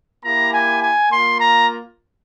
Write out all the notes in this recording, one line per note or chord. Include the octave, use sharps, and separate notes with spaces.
A#3 E4 G4 A#5
G#5
G#5
A#3 F4 C6
A#5